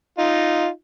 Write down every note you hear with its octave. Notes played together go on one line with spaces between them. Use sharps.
D#4 F4